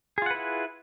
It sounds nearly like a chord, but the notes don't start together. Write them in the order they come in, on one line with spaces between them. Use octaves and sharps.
G#4 F4 F#5 B4 E4